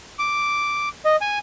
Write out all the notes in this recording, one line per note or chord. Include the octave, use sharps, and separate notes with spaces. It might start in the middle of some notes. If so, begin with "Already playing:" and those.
D6
D#5
G#5